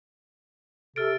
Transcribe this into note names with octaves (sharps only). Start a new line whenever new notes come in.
C3 A4 F6 A6 D7